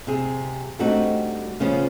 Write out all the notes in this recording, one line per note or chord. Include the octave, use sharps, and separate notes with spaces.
C3 G#4
G3 A3 C4 D4 D#4 F#4
C#3 F3 B3 C#4